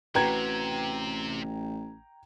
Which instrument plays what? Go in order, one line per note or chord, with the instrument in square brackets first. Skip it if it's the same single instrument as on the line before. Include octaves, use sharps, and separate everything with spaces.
[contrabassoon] A1 [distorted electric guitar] C3 [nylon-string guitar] F#4 B4 [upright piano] G5 A#5 G#6